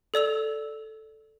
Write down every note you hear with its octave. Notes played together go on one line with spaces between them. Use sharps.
A4 D5 E6 F7